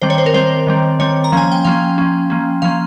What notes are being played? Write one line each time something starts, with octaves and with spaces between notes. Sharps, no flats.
D#3 G3 C4 C5
C#5
C5
A#4
D#3 G3 C4 C5
D#3 G3 C4
D#3 G3 C4 C#5
A#5
F3 A#3 C#4 G#5
G5
F3 A#3 C#4 F5
F3 A#3 C#4
F3 A#3 C#4
F3 A#3 C#4 F5